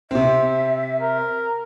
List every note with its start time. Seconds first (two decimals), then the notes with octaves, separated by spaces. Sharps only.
0.11 C3 C4 E5
1.00 A#4